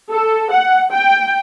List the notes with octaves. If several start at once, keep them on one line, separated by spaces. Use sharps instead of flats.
A4
F#5
G5